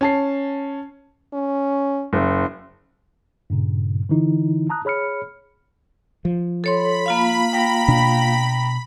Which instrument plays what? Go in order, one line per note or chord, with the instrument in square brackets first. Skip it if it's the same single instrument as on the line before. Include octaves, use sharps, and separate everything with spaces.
[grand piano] C#4 A5 C7
[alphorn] C#4
[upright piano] F#1
[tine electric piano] G2 A#2 C#3
D3 E3 D#4 E4
A5 A#5 D#6 F#6
G#4 C#5 B5 F6 C#7
[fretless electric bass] F3
[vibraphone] A4 C#5 C6 [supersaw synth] B5
[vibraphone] A#3 F4 F5
[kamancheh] G5 A#5
[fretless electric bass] B2 D4